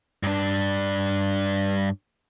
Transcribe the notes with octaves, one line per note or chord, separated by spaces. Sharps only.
G2 D4